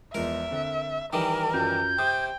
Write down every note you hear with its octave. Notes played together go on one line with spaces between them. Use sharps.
E2 F3 G#3 A#4 E5
D3 C4
D#3 E3 G3 D#4 A#4
F#2 F#3 F4 G6
C3 G5 D#6